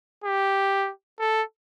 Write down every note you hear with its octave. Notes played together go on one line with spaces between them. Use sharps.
G4
A4